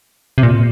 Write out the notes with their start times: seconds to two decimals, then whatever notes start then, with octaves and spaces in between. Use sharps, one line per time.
0.38 C3
0.43 A#2